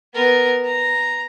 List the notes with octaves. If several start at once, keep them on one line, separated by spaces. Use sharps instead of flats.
B3 A#4
A#5